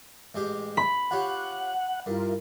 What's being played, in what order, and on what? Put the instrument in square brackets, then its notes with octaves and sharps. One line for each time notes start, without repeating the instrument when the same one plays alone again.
[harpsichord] A1 G#3 G4
[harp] B5
[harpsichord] F4 G4 C#5 [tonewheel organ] F#5
[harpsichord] G2 [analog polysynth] E4 F4 A#4